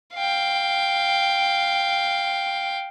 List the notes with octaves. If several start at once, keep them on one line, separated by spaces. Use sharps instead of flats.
F5 G5